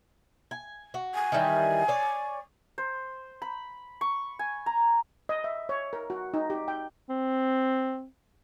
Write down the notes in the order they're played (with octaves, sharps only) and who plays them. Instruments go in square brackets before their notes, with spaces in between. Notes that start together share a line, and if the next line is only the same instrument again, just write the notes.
[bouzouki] G#5
F#4
[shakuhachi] G#5
[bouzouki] D#3 E3 G3
C#5 D5
[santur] C5
B5
C#6
G#5
A#5
[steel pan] D#5
E5
C#5
A#4
F#4
D#4
G4
G5
[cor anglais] C4